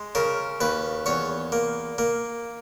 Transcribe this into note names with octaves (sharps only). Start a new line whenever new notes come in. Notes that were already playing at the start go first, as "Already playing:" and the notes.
Already playing: G#3
C#3 A#4
D#2 B4
E2 C#5
A#3
A#3